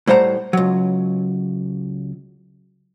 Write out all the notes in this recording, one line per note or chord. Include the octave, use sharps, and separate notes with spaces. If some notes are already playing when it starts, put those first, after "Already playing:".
A2 G3 C5 F#5 A#5
C#2 F#3